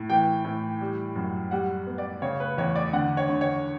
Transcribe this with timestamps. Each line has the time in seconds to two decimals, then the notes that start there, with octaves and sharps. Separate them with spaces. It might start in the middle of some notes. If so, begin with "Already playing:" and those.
Already playing: A2
0.10 E3 G5
0.45 A2
0.81 G3
1.16 F#2
1.51 G3 F#5
1.87 B3
1.98 D5
2.22 C#3 C#5
2.40 B4
2.58 E2 C#5
2.76 D5
2.93 D3 F#5
3.17 C#5
3.29 D3
3.41 C#5